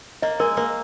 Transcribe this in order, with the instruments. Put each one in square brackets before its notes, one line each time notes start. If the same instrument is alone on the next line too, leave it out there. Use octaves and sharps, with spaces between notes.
[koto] A#3 [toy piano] D#5
[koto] G#3 [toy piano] A#4
[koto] A#3 [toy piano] A#4